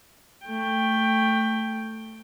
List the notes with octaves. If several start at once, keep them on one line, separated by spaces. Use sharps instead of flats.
A3 G5